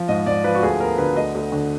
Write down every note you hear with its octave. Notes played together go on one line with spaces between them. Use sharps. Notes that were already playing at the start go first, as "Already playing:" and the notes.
Already playing: F3
G#2 D#5
G#2 D5
F3 B4
F#4
D2 G#4
B3 A#4
D3 B4
D2 D#5
D2
D3